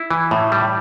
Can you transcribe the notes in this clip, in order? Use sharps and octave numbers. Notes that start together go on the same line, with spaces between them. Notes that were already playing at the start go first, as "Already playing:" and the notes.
Already playing: E4
E3
A2
G3